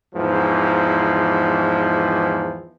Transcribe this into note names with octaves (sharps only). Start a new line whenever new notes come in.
E2 G#2 E3 F3